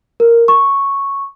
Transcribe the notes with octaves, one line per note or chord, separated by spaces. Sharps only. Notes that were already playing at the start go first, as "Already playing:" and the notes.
A#4
C#6